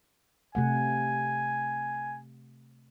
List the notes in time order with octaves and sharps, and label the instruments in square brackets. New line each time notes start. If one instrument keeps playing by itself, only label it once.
[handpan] C3 A3 F#5 [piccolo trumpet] G#5